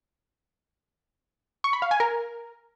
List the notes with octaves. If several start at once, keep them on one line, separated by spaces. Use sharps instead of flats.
C#6
B5
F5
G#5
A#4